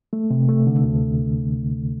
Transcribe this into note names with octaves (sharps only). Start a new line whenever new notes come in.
A3
C3
A3
D3
D2